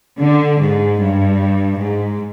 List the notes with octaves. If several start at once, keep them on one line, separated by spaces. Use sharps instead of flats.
D3
G#2
G2
G#2